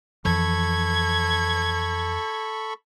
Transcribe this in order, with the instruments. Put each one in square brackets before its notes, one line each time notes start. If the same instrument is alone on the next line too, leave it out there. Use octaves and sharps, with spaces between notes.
[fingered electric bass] F2 E3 F3 [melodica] A4 B5 C#6 [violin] G#6